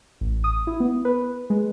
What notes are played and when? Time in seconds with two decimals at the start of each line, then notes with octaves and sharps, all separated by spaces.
0.21 A1
0.44 D#6
0.67 E4
0.80 B3
1.05 B4
1.50 G#3